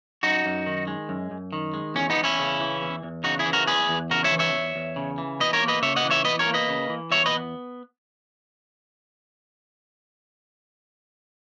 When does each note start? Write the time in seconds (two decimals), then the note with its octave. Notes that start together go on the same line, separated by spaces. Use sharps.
0.23 F#2 D#4 F#4
0.46 F#2
0.66 D#3
0.87 G#3
1.09 F#2
1.31 F#2
1.53 D#3
1.74 G#3
1.95 E2 C#4
2.10 B3 D#4
2.17 E2
2.24 C#4 E4
2.39 C#3
2.60 E3
2.82 E2
3.03 E2
3.24 C#3 D#4 F#4
3.39 E4 G#4
3.46 E3
3.53 F#4 A#4
3.67 E2 G#4 B4
3.89 E2
4.10 C#3 F#4 A#4
4.24 C#5 E5
4.32 E3
4.39 C#5 E5
4.53 E2
4.76 E2
4.96 C#3
5.18 E3
5.40 E2 B4 D#5
5.53 A#4 C#5
5.61 A#3
5.68 B4 D#5
5.82 C#3 C#5 E5
5.96 D#5 F#5
6.05 E3
6.11 C#5 E5
6.25 E2 B4 D#5
6.39 A#4 C#5
6.48 A#3
6.54 B4 D#5
6.69 C#3
6.89 E3
7.11 E2 C#5 E5
7.26 B4 D#5
7.33 B3